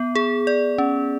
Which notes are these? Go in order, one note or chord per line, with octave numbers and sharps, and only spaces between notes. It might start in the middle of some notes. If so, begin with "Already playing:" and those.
Already playing: B3
G#4
D5
C#4